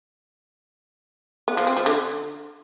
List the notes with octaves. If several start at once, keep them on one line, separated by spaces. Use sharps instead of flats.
B3
F3
C4
F3
D3